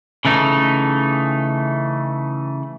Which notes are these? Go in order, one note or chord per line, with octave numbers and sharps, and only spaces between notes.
C#3 E3 A3 D#4